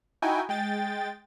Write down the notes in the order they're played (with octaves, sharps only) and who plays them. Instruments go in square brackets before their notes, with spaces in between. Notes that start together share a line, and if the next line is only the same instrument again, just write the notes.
[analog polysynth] D#4 E4 F#4 G5 G#5
G#3 G5 A6